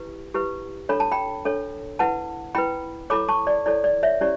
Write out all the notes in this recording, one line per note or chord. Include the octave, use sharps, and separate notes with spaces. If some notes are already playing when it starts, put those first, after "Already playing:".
Already playing: E4 G4 B4
E4 G4 B4
D4 A4 C#5 B5
A5
G5 B5
D4 A4 C#5
E4 B4 F#5 A5
E4 B4 G5 B5
E4 A4 C#5 B5 D6
A5 C#6
D5
E4 A4 C#5 D5
D5
C#5 E5
C#4 E4 G4 C#5 D5